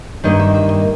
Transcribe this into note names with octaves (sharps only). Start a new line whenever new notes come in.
G2 D#3 A#3 D#4 D#5
E5
E5
D#5